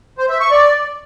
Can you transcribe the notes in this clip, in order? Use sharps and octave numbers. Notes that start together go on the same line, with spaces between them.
C5
E5
C#6
D5